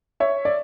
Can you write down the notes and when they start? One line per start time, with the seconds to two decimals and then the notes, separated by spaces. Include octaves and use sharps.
0.20 C#5 E5
0.45 D5